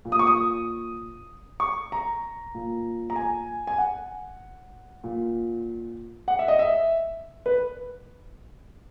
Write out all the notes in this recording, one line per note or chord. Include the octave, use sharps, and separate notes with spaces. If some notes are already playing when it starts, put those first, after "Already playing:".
A#2
D#6
C#6
D#6
C#6
A#5
A#2
A#5
G#5
G#5
F#5
A#2
F#5
E5
D#5
E5
B4